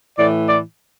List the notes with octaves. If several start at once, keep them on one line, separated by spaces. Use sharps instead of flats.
A2 E3 D5
D5